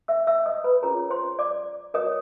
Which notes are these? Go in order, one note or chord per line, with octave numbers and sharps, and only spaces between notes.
E5 E6
E5 E6
D#5 D#6
B4 B5
C#4 F4 G#4 A#4 C#5 A#5
C5 C6
D5 D6
F#4 A#4 C#5 D#5 D#6